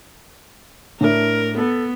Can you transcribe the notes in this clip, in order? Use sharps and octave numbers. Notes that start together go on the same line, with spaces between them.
A2 D4 E4 A#4
B3 A4